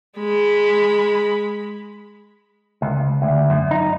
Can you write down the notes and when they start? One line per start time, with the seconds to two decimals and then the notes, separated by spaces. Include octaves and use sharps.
0.19 G#3 B5
2.82 C#2
3.22 D2
3.50 F#2
3.71 D#4